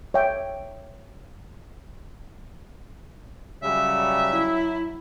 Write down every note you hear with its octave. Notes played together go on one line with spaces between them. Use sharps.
C#5 E5 G5
C#3 F#3 G3 E5
E4